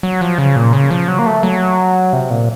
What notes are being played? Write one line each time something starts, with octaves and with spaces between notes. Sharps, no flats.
F#3
F3
C#3
A#2
C#3
F3
F#3
A#3
A3
F#3
C3
A#2